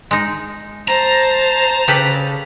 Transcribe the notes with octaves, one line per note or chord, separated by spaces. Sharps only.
G#3 D#4
C5 A5 A#5 A#6
C#3 G4 A4 B4